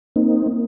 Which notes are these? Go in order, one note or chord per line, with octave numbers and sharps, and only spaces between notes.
A#3 C4 D#4
A#3